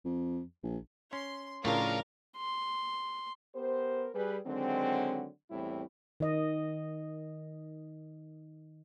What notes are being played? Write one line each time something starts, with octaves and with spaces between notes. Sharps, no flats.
F2
A#1
C#4 C6
A2 C#3 F3 D4 F4 A#4 F5 A#5
C6
B3 G4 A#4 C5
G3 G#4 B4
D3 D#3 F#3 G#3 C4
E2 A2 E3 G3 C4 E4
D#3 D#5